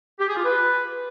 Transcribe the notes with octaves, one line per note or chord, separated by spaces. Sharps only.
G4
G#4
F4
B4